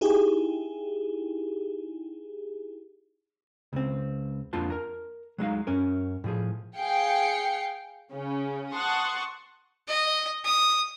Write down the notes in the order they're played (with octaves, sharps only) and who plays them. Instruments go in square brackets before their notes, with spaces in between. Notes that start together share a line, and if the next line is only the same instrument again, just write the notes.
[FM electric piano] D#4 E4 G4 G#4
[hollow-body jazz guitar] C#2 C4
F2 A#3 D4 F4 A5 C6
A#4 A#5
F#3 G#3 D#4 F5
F#2 C#4 A#4
A2 F3 G#4
[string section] G#4 F5 G5 C7 C#7
C#3 C#4
F#5 A5 C6 C#6 D#6
[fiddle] D#5
D#6